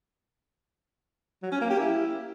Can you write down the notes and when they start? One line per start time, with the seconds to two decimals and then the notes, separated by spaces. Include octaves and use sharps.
1.43 F#3
1.52 C#4
1.61 A#3
1.70 G4
1.79 E4